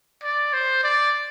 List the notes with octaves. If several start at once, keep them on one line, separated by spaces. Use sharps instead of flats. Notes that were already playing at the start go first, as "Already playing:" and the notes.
D5
C5
D5